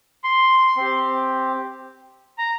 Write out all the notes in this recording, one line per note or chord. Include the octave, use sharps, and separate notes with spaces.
C6
C4 G4
A#5